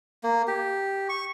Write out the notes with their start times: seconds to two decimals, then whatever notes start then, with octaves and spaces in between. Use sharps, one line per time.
0.23 A#3
0.47 G4
1.09 C#6